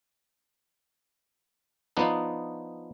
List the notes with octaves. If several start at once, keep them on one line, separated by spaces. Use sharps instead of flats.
F3 B3 D4 D#4